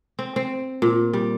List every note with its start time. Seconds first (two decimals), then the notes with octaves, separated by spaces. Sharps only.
0.19 C4
0.36 C4
0.82 A#2
1.13 G3